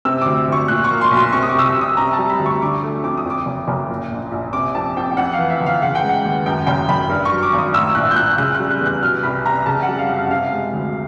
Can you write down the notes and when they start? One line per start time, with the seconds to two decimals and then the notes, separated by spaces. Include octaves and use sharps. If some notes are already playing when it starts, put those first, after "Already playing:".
0.05 C3 E6
0.21 D2 D6
0.48 D2 C#6
0.68 A#2 F#6
0.84 C#6
0.91 A#3
1.01 C6
1.11 B1
1.16 C6
1.33 C3 C#6
1.43 D#6
1.49 D6
1.55 C2 E6
1.66 D#6
1.76 C2
1.81 D#6
1.97 C3 A#5
2.13 A5
2.19 G3
2.30 B5
2.39 D2
2.46 C#6
2.61 D3 D6
2.83 A3
3.04 F2 D6
3.17 D#6
3.26 F2 D6
3.46 F#1
3.68 F#1
3.90 A#2
4.11 A#1
4.32 A#1
4.53 C3 D6
4.75 F2 A5
4.96 F2 G5
5.11 G5
5.17 F2 F#5
5.33 F5
5.39 E3
5.50 E5
5.61 G1
5.66 F5
5.82 C#3 F#5
5.95 G5
6.03 G#3
6.09 F#5
6.25 D#2
6.46 F#2 G5
6.67 F#1 G5
6.89 F#1 B5
7.09 G2
7.25 C#6
7.31 F#3
7.43 D6
7.53 G#1
7.58 D#6
7.74 A2 E6
7.95 A#1 F#6
8.11 G6
8.16 A#1 F#6
8.38 C#3 F#6
8.55 F#6
8.60 G3
8.70 F#6
8.80 E2
8.86 F#6
9.03 B2 F6
9.23 C2 B5
9.45 C2 A#5
9.66 C#3 A5
9.83 F#5
9.88 G3
9.99 F5
10.09 F#2
10.14 E5
10.25 F#5
10.31 C3 F5
10.52 G#3
10.73 D2